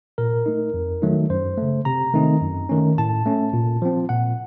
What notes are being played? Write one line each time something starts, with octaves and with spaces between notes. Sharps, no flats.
A#2 A#4
A3 D#4
F2
D#3 F#3 A3 D#4
F#2 C5
C#3 A3
C3 A#5
D#3 A3 C4 D#4
F#2
D#3 A3 C#4
A2 A5
A3 C#4
A#2
F3 C4
A#2 F#5